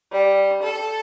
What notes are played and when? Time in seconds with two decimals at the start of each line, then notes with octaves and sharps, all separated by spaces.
0.12 G3
0.63 A4